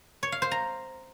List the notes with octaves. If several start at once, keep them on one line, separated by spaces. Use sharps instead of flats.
C#5
F5
C5
A#5